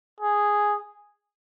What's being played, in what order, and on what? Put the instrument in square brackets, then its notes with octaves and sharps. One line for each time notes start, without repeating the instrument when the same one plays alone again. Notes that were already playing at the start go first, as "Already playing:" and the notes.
[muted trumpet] G#4